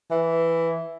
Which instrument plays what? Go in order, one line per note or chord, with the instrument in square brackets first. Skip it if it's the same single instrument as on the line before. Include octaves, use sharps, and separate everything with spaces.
[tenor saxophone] E3